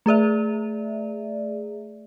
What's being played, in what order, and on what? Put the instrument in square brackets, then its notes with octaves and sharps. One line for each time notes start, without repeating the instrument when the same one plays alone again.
[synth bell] A3 G#4 D5 E5